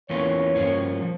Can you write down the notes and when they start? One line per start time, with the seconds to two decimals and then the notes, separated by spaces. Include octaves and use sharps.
0.10 E2 E3 A#3 C#4 F4 C#5
0.56 G2 F3 A#3 C#4
1.02 F3